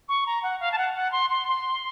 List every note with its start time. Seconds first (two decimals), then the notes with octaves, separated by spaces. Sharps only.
0.08 C#6
0.26 A#5
0.43 F#5
0.59 F5
0.71 A5
0.77 F#5
0.94 F#5
1.11 C6
1.30 C6
1.47 C6